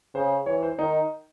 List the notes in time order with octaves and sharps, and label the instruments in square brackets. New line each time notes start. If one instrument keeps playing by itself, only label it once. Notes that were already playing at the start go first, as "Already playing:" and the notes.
[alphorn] C#3 [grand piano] C5
[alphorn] E3 [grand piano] C#5
[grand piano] C5
[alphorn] D#3 [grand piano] D#4